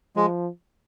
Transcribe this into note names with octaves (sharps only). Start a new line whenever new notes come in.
F3 G#3